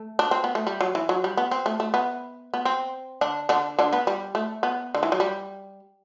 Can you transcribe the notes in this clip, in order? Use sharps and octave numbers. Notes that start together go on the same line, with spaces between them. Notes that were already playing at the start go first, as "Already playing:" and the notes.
Already playing: A3
D4
C4
B3
A3
G3
F#3
E3
F#3
G3
B3
C4
A3
A3
B3
B3
C4
D3 D4
D3 D4
D3 D4
B3
G3
A3
B3
D3
E3
F#3
G3